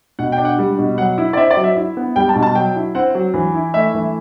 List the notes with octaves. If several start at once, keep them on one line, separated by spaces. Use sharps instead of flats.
B2 F#5
G5
D4
F#5
G3
B2
F#3 F#5
E4
D5
C4 E5
D5
F#3
E5
E4
B3
G3 G5
A5
B2
A5
F#3 G5
E4
C4 F#5
F#3
E3
E4
A3 E5
E3